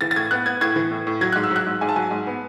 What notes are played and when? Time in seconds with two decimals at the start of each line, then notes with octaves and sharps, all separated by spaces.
0.01 E3 A6
0.11 A6
0.16 A2 G#6
0.31 B3 F#6
0.46 B3 G#6
0.61 A2 G#6
0.76 E3
0.91 A2
1.07 A2
1.21 F#3 G#6
1.33 G#2 F#6
1.44 E6
1.51 F#3 F#6
1.66 G#2
1.81 G#2 G#5
1.89 A5
1.96 F#3 G#5
2.11 G#2
2.27 B3